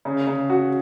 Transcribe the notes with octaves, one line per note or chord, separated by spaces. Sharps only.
C#3
C#3
F#4